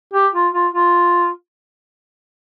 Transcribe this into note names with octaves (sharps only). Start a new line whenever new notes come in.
G4
F4
F4
F4